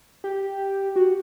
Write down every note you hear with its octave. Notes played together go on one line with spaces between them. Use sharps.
G4
F#4